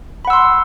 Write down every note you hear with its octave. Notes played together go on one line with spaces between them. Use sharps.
F#5 B5 C6 E6